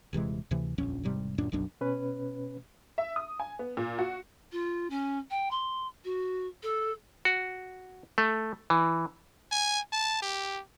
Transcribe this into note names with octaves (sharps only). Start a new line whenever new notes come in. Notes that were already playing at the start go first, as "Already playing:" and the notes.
D#1 C3 E3 G#3
D2 C3 E3
D#1 A#1 F2 C#4
E1 G#2 C3 G3
D1 F#2 A#2 D4
F#1 B1 F#2 D4
B2 C#4 B4
E5
D#6
G#5
B3
A#2
F#4
F4
C#4
G5
C6
F#4
A4
F#4
A3
E3
G#5
A5
G4